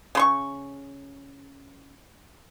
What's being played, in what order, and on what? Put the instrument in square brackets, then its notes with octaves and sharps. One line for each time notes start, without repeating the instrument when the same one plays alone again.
[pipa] C#3 C6 C#6